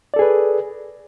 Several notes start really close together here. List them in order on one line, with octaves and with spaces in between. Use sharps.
D5 A4 G#4 B4